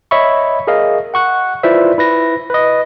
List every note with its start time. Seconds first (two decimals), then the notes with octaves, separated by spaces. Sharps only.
0.11 C#5 D#5 E5 B5 C#6
0.67 G#4 A#4 D#5 F5
1.14 F#5 C#6 F#6
1.63 E4 F4 B4 C5 D5 E5
1.98 E4 B4 A#6
2.50 B4 D#5